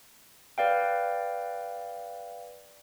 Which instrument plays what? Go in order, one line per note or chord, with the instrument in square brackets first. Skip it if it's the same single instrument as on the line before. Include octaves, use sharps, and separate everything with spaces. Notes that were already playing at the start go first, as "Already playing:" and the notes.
[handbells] B4 D5 F5 G5